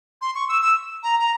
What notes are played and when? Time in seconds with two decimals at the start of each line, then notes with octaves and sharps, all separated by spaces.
0.21 C6
0.35 C#6
0.49 E6
0.62 E6
1.03 A#5
1.20 A#5